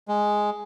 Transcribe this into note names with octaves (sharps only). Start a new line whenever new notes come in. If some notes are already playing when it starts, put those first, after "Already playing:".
G#3